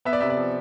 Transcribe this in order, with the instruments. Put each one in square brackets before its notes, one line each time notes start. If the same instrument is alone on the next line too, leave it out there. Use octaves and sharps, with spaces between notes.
[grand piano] B3 E5
D5
C3 E5
D5
F3